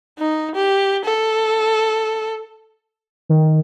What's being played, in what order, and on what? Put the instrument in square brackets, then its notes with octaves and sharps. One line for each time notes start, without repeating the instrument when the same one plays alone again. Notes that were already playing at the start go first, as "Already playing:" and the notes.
[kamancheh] D#4
G4
A4
[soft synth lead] D#3